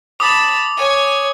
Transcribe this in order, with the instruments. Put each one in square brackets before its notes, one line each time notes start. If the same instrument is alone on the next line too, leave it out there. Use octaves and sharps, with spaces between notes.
[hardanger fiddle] A5 B5 [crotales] D6 D#6
[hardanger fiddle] C#5 G#5